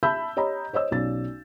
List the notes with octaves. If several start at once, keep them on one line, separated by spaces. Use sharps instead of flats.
E5 A5 B5 E6 G6
G4 C#5 D#5 A#5 B5
C5 C#5 D#5 E6
B1 C#4 D5 A6